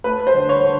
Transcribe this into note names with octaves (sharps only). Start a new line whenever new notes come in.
A3 B4
C5
D3
C#5
D3